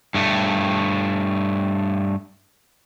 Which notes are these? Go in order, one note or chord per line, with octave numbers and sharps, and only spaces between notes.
G2 A3